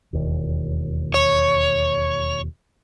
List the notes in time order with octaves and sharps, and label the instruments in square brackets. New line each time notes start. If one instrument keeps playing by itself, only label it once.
[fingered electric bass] E1 D#2
[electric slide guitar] C#5